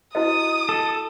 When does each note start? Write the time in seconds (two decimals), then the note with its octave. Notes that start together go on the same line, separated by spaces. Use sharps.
0.15 E4 F#4 D#5 D#6
0.69 A4